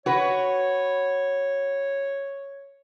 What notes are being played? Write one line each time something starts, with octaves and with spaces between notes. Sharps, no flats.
F#4 B4 C#5